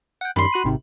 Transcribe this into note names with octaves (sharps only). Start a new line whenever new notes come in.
F#5 G5
F#2 D#3 G3 B5 C6
F#4 F#6 D#7
G#1 C3 D#3